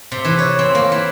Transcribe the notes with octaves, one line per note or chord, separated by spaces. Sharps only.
C3
E3
C#5
C4
A#3
E3